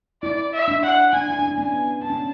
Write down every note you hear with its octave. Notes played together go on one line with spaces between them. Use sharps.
E4 D5
E5
D4
F#5
D4 G#5
E4
D4
C#4
B3 G#5
D4 A5
C#4